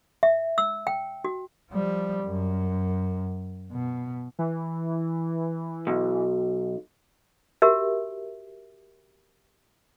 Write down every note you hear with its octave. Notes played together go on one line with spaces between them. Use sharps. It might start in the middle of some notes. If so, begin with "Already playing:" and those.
E5
E6
G5
F#4
F3 G3
F#2
B2
E3
B1
F#4 G4 A#4 E5